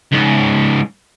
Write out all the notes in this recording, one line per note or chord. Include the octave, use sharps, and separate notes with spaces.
C#2 G#2